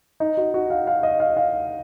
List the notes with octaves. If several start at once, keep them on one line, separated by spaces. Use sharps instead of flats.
D#4
F#4
F#4
F5
F5
D#5
F5
F5